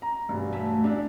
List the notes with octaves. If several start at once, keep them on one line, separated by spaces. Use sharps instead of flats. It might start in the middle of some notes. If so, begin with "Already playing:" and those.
A#5
E1 G2
A3 C#5 E5
G#3 D4 E4